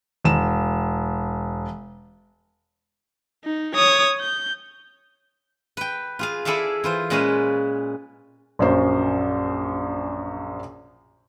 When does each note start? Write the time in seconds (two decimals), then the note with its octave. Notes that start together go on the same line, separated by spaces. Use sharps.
0.24 E1 E7
3.45 D#4
3.75 C#5 D#6
4.21 G6
5.77 B4 G5
6.19 F4 G#4 F5
6.45 E4 G#4 A4 D5 E5 F5
6.84 E3 F4 C5
7.10 A#2 G#3 C#4 G#4 B4
8.59 A#1 F#2 C#4 C5